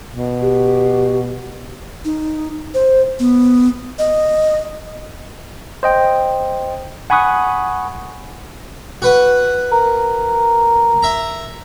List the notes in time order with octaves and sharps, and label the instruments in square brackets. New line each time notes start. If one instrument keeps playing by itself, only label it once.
[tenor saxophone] B2
[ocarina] G4
D#4
C5
B3
D#5
[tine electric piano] C5 D#5 G5
F#5 G#5 B5 C#6 D#6 F#6
[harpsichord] F#4 B4 F#5
[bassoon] A#4
[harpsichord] E5 A#5